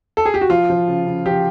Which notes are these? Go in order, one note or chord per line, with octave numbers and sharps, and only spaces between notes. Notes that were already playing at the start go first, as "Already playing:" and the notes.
A4
G#4
G4
F#4
F3 F4
F3
C#3
C#3
F3 G4